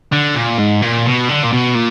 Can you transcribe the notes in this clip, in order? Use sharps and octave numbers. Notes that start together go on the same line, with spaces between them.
D3
A#2
G#2
A#2
B2
D3
A#2
B2
A#2